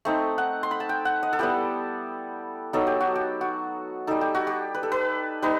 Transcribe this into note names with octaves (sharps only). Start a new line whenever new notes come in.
A3 C4 D#4
F#5
C6
B5
A5
G5
F#5
D#5
A4
G3 B3 E4 G4
F#3 B3 D#4 A4
G4
F#4
G4
F#4
G3 D#4 A4
G4
F#4
G4
B4
A4
B4
G3 D#4 B4